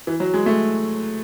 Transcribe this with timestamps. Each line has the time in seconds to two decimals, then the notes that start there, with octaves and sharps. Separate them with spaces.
0.07 E3
0.20 F#3
0.34 G#3
0.46 A3